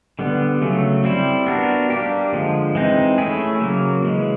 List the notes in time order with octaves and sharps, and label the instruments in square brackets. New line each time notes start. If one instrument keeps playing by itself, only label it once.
[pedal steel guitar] D3 G3 B3
C#3 F#3 A3
G3 C4 E4
B3 D4 F#4 A#4
G3 A#3 D4 G4
D3 F3 G#3
E3 G#3 C4 D#4
A3 C#4 E4 G#4
C#3 F#3 A#3
C#3 E3 G#3